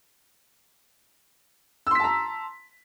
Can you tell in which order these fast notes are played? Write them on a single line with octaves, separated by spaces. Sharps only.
E6 C6 B6 A5 A#5